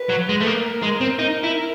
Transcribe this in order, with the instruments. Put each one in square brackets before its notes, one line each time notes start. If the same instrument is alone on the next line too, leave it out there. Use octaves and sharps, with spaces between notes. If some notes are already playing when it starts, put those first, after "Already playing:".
Already playing: [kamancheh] B4
[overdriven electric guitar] F#3
G#3
A3
[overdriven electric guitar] A#3 [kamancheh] A#4
[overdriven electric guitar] G#3
C4
[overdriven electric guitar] D#4 [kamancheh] A#4
[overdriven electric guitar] E4